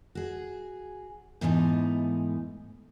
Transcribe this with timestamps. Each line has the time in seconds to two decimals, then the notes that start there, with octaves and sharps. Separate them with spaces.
0.15 F#4 G#4
1.41 G#2 E3 A3 B3 D#4